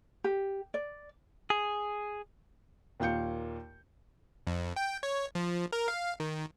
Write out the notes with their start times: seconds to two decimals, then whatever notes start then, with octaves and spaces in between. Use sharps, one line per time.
0.24 G4
0.74 D5
1.50 G#4
3.00 D#2 A#2 F5 G6 C#7
4.47 F2
4.76 G5
5.03 C#5
5.35 F3
5.72 A#4
5.88 F5
6.20 D#3